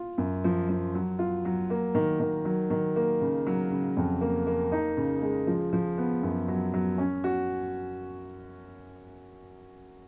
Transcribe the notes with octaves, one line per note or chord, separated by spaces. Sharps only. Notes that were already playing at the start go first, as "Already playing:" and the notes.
Already playing: F4
F#2
F3
F3
F#3
F4
F#3
A#3
D#3
D#3
F#3
D#3
A#3
C#3
F#3
C#3
F2
A#3
A#3
D#4
C#3
G#3
F3
F3
B3
F#2
F#3
F#3
C#4
F#4